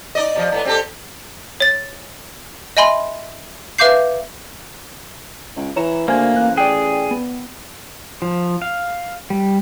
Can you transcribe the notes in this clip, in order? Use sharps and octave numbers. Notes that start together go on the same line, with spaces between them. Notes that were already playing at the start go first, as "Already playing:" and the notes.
D#4 D5 D#5
C3 F3 D#5
A2 A#3 B3
C4 G4 A4
C#5 A6
D#5 E5 G#5 B5 C6
B4 E5 F5 D6 G6 C7
C#2
E3 C#5 A#5 E7
D2 A#3 C5 G#5 G#6
A1 F#6
G#4 D5 G5
B3
F3
F5
G3